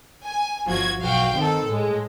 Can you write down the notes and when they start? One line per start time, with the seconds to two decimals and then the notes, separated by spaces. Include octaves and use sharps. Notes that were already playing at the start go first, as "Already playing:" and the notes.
0.25 G#5
0.66 G1 F3 F#4 G#6
1.01 B1 F#4 F5 G5
1.36 D#3 C4 A4
1.67 A2 G#3